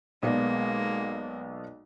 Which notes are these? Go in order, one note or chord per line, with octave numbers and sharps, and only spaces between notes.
B1 G#3 A#3 B3 D5